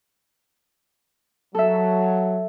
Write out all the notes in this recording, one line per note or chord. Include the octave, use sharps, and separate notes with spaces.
F#3 A4 E5